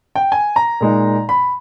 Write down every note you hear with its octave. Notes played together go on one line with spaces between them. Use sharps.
G5
G#5
A#5
A#2 G#3 D#4
B5